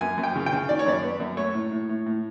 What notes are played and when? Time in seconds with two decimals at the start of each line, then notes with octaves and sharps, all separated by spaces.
0.01 F#2 G#5
0.17 F#2
0.23 G5
0.36 C#3
0.46 G5
0.53 C#3
0.69 D#3 D5
0.79 C#5
0.86 F#2 D5
1.04 B3
1.20 F#2
1.37 A3 C#5
1.54 A2
1.72 A2
1.89 A2
2.06 A2